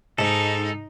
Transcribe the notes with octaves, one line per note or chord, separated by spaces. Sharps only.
G#2 D#4 A4